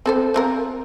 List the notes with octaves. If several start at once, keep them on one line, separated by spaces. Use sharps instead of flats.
C4 A4 C5
F3 C4 A#4